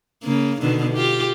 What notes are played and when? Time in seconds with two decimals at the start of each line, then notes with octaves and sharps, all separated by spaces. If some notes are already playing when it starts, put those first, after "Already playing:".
0.23 C#3 A#3
0.61 B2 D3 D#3
0.94 F4 G4